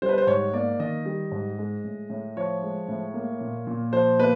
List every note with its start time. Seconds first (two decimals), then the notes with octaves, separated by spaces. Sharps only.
0.02 G3 C5
0.09 B4
0.18 C5
0.27 G#2 C#5
0.53 A#3 D5
0.79 D#3 D#5
1.05 G3
1.32 G#2
1.58 G#3
1.84 A2
2.10 A2
2.37 F3 C#5
2.62 G#3
2.88 A2
3.14 A#3
3.41 A#2
3.67 A#2
3.92 F3 C5
4.19 A#3 B4